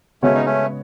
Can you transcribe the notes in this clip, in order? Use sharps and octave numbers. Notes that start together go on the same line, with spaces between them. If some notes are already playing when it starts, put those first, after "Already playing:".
C#3 G#3 A3 B3 C#4 F#4 C#5
D#4
A3 C#4